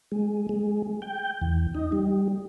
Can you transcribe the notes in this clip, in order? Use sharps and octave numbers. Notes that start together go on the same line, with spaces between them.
G#3
G#3
G5
E2
D#4
G3